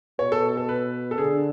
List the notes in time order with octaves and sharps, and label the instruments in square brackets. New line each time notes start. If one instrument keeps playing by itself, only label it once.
[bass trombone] B2 [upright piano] C#5
[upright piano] A4
A4
B4
A4
[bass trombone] D3 [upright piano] G#4